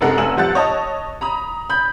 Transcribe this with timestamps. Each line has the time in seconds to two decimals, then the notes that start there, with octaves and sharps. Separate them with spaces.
0.01 F#2 C3 G#3 A4 A#4 F#5
0.18 F1 F#5 G#5 E6 E7 F#7
0.37 F3 G3 F#5 F#6 A6
0.55 C#5 D#5 A5
1.21 A#5 B5 D#6
1.70 B5 G6